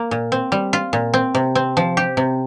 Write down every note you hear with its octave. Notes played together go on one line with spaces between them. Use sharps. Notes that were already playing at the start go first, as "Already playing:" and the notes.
Already playing: A#3
A#2
C4
G3
F4
A#2
C4
C3
C4
F3
G4
C3